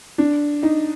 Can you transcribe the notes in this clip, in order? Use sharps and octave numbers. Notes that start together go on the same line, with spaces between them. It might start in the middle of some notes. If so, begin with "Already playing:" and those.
D4
D#4